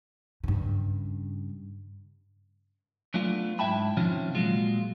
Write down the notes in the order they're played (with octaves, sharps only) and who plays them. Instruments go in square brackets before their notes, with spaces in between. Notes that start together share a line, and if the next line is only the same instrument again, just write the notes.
[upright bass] G2 C#3
[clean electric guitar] F#3 A3 B3 D4 F4
G#2 E4 E5 G5 A5 B5
C3 D#3 F3 C#4 F4
A#2 F#3 G#3 F4